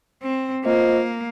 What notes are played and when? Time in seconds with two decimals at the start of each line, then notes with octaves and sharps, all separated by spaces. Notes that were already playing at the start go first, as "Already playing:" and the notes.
0.23 C4
0.65 A#3 F4 C5 D#5